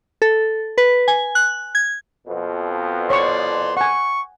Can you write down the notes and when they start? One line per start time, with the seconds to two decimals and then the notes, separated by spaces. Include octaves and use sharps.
0.22 A4
0.78 B4
1.08 G#5
1.35 F#6
1.75 G#6
2.27 F2 B2
3.10 C#5 D5 C6 C#6
3.77 F#5 G#5 C#6